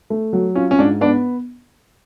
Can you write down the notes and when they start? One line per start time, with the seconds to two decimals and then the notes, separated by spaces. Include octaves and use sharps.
0.10 A3
0.33 F#3
0.55 C#4 F4
0.71 C#4
0.78 G#2 D4
1.01 B3 D4